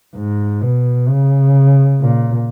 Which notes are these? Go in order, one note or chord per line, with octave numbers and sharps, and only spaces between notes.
G#2
B2
C#3
A#2